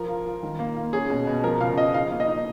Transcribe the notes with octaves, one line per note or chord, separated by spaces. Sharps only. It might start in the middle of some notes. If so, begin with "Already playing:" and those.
Already playing: F3 A#4
F4
F4
D#3
A#3
F4
C#4 G#4
B2
B2
F3 A#4
C#3 F5
F3 D#5
D#4 F5
A#3
D#5
D#4